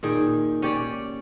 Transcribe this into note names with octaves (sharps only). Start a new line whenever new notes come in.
A#2 D#3 G#4 G5
C#4 G4 C#5 D5